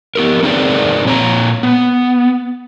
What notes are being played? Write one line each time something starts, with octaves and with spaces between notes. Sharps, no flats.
B3 G4 A#4
C4 D#4 G#4 A#4 B4 D5
A#2 C#5 A#5
B3